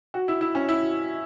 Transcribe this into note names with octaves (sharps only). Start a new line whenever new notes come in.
F#4
E4
E4
C#4
E4